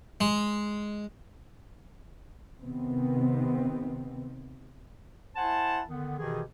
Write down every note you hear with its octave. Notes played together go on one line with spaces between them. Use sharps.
G#3
C3 D#3 B3 C4
E4 C5 F#5 G#5 A5
D3 D#3 B3
B2 D#3 E3 G4 G#4